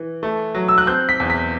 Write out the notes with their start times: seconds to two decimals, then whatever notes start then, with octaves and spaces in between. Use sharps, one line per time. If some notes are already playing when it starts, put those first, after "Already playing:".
Already playing: E3
0.23 A3
0.55 F#3
0.68 E6
0.78 F#6
0.87 C4 G6
1.09 B6
1.20 E2
1.30 B6